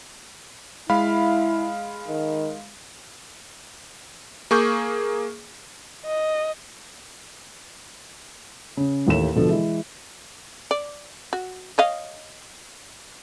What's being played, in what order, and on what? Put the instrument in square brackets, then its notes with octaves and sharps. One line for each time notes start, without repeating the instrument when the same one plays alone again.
[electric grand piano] G#3 F5 B5 [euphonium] E4
[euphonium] D#3
[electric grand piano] A#3 G#4 C#6 D6 G6
[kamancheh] D#5
[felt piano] C#3
A1 D#2 A3 E7
B2 D3 F3 A4
E3 G#3
[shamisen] D5
F#4
C#5 D#5 F5